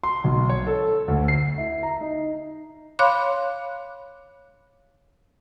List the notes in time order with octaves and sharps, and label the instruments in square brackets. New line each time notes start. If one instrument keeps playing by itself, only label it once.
[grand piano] C6
B1
C#5
A4
D2
C7
E4
A#5
D#4
[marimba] C#5 F5 B5 C6 D6 F#6